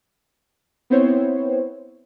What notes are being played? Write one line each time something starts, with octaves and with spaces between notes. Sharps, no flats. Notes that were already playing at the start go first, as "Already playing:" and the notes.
B3 C4 E4 C5 C#5